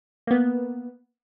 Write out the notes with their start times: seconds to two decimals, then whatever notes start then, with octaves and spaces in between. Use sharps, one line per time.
0.27 A#3 B3